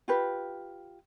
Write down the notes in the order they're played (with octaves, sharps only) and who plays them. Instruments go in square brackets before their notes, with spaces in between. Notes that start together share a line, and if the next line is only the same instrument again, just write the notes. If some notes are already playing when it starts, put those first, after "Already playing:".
[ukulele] F4 G4 B4